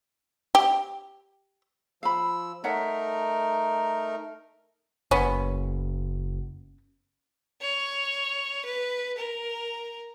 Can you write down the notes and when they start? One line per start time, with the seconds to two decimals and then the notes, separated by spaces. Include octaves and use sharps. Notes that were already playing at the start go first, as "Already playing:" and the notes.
0.55 G4
2.03 F3 F5 B5 E6
2.64 A3 D#4 A#4 C#5 E5 F#5
5.11 F#1 B3 C#4
7.61 C#5
8.65 B4
9.18 A#4